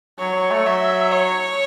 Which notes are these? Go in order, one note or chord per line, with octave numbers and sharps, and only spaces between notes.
F#3 C#5
F#3
A3
F#3 E5
C#5